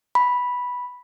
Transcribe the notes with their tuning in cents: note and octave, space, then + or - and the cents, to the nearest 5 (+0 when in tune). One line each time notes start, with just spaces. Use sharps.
B5 -5